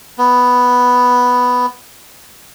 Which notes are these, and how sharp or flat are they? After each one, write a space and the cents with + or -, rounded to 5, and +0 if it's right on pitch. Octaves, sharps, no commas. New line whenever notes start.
B3 +0